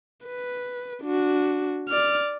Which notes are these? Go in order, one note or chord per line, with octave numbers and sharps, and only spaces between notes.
B4
D4 F#4
D5 F6